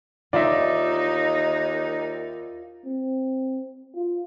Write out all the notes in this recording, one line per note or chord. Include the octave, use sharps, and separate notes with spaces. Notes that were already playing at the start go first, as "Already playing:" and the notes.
D#2 D#4 F4 D5 E5
C4
F4